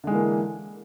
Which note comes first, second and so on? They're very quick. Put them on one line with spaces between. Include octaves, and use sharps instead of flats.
D3 G#3 E3 A#3